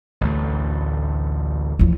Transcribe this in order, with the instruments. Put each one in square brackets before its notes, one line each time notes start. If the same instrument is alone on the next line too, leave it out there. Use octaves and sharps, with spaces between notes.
[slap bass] A1 D2 A3
[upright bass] E2 F3